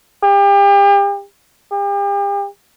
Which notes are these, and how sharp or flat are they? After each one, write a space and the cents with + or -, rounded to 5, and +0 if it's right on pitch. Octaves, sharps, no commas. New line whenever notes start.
G4 +35
G4 +40